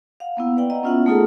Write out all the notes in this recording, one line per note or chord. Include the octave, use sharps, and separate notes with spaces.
F5 F#5
A#3 B3 E4
B4 D5 F#5 G5
D#5 A#5
B3 C#4 E4 F4 E5 F#5
A3 A#3 D#4 F4 G#4 A4